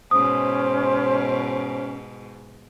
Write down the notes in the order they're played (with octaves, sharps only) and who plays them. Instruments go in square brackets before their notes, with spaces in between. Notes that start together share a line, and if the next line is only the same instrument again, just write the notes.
[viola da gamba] G#2 B2 [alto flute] C#4 [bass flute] C5 [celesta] D#6